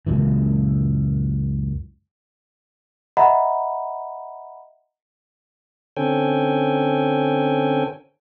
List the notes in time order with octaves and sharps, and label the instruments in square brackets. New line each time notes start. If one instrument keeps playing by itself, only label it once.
[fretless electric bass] C#2 F#2 A#2 E3
[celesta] D#5 E5 F#5 A#5 B5
[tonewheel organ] D3 C4 C#4 A4 G5 G#5